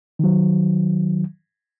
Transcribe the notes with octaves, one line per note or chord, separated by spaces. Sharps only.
D#3 F#3